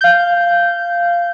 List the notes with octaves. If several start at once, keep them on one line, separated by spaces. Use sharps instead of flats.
F5 G6